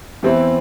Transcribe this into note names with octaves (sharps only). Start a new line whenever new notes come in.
E2 E3 C4 E4